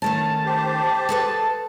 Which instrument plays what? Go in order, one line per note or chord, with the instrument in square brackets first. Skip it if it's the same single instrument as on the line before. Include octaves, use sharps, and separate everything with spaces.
[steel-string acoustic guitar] D#3 A3 C#4 [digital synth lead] A5
[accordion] G4 C5
[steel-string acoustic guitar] G#4 A4 B4